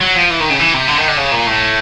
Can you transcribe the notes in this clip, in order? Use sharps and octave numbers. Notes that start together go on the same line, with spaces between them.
F#3
F3
E3
D#3
C#3
E3
C3
D3
D#3
D3
C#3
A#2
A2